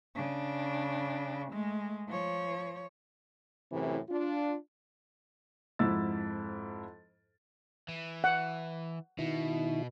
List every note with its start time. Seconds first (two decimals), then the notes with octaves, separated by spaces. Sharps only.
0.15 C#3 D4
1.51 G#3 A3
2.08 F3 C#5
3.71 F#2 A2 C3 E3
4.10 D4 F4
5.79 F2 G#2 E4 B5 E6 A6
7.88 E3
8.24 F#5
9.19 B2 D#3 E4